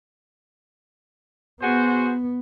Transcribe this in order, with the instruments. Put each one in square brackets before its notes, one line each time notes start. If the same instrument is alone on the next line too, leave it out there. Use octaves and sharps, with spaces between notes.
[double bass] B3 [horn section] F#4 G#4 C5